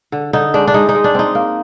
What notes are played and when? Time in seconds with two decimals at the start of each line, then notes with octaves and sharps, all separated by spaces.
0.12 D3
0.33 D3 D#4
0.54 G#3 D4
0.68 D4
0.74 G#3 D#4
0.89 D#4
0.95 G#3
1.04 D4
1.15 C4 D#4
1.35 A#3